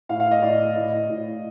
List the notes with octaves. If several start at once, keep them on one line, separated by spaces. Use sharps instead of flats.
A2 F5
F5
D#5
A2 D5
A2 D#5
A2